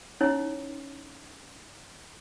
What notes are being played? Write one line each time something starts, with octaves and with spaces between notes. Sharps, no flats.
C#4 D#4 E4 C#5